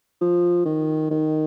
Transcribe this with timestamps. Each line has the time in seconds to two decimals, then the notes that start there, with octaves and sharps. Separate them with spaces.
0.21 F3
0.65 D#3
1.10 D#3